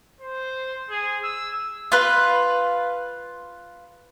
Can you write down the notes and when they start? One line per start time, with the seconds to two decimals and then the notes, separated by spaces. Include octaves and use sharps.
0.21 C5
0.90 G#4
1.23 E6
1.92 F4 B4